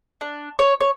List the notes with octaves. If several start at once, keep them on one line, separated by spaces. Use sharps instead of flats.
D4
C#5
C#5